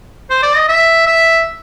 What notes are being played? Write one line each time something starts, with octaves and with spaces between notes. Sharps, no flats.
C5
D5
D#5
E5
E5